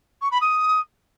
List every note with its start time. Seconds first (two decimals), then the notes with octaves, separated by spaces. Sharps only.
0.21 C#6
0.31 B5
0.41 D#6